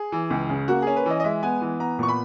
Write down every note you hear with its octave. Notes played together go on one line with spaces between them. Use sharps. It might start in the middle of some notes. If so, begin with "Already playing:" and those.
Already playing: G#4
E3
C#2
C#3
A#3 F#4
C#4 G#4
B4
E3 D#5
D#5
G#3 E5
B3 G#5
E3
B3 A#5
A#2 C#6
B5